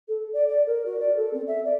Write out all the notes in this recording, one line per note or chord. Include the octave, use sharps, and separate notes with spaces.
A4
D5
D5
A#4
F#4
D5
A4
C4
E5
D5